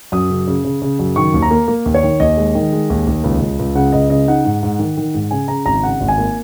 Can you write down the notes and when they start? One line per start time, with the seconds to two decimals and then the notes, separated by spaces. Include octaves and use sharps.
0.12 F#2 D#6
0.30 C#3
0.48 C#3
0.65 C#3
0.82 C#3
0.99 F#2
1.16 D#3 C#6
1.34 D#2
1.42 A#5
1.51 A#3
1.68 A#3
1.86 D#2
1.95 C#5
2.03 D#3
2.20 D#2 D#5
2.37 G#3
2.55 D#3
2.73 G#3
2.90 D#2
3.07 D#2
3.24 C#2
3.41 C#2
3.59 C#2
3.75 C#3 F#5
3.93 C#2 D#5
4.10 C#3 D#5
4.28 D#4 F#5
4.45 G#2
4.63 G#2
4.79 D#3
4.97 D#3
5.14 G#2
5.31 C#3 G#5
5.48 C#3 A#5
5.65 G#1 A#5
5.83 C#3 F#5
6.00 G#1
6.08 G#5
6.18 A#3